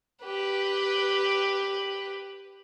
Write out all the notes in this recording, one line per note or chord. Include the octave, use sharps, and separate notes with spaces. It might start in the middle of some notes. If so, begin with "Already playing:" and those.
G4 B4